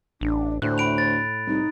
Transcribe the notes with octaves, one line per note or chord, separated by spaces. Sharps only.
A1 D4
D2 A2 C5 F#6
B5 D7 F7
A6
C2 D#4